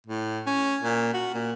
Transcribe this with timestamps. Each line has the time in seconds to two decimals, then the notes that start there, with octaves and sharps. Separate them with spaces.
0.07 A2
0.47 C#4
0.82 A#2
1.14 F#4
1.34 A#2